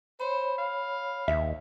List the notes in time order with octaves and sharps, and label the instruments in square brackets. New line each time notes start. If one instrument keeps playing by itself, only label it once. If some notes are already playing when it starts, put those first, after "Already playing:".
[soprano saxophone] C5 [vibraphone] C#5 B5
[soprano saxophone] F5
[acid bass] D#2 [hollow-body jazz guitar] E5